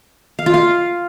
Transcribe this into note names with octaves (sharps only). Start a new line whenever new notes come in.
F5
F4
F5